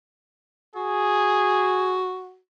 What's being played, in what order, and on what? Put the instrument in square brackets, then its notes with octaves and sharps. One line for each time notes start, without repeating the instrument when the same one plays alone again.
[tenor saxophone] F#4 [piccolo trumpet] G#4